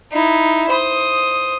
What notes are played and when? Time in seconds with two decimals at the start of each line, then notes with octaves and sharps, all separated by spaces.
0.12 D#4 E4
0.69 C5 D#6